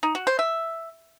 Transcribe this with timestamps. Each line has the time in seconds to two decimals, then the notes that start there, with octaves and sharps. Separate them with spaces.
0.03 D#4
0.15 F#4
0.27 C5
0.39 E5